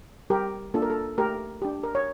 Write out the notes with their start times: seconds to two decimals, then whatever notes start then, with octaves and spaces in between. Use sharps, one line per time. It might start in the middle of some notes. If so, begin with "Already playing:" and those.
0.30 G3 G4 A#4
0.74 A#3 D4 F4 A4
0.82 A#4
0.90 A4
1.18 A3 G4 A#4
1.62 D4 G4
1.83 A#4
1.95 C#5